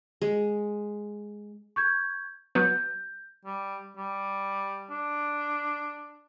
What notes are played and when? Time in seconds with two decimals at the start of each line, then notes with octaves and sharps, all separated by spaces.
0.22 G#3
1.76 C#6 G6 G#6
2.55 F#3 B3 G6
3.45 G3
3.97 G3
4.90 D4